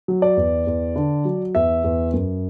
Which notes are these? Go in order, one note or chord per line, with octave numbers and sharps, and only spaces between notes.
F#3
D5
E2
E2
D3
F#3
E2 E5
E2
F#2